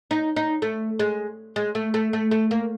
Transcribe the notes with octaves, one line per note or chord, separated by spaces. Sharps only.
D#4
D#4
A3
G#3
G#3
A3
A3
A3
A3
A#3